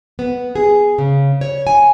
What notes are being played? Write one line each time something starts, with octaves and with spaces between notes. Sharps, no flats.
B3
G#4
C#3
C#5
G#5